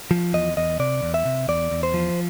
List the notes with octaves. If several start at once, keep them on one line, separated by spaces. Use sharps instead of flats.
F3
E2 D#5
E2 D#5
C3 D5
E2
E5
C3
E2 D5
E2
C5
F3